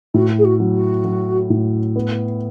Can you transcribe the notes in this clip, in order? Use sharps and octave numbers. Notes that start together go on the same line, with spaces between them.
A2 F#4
G#4
F#4
F#3
F#4
F#3
A2
B3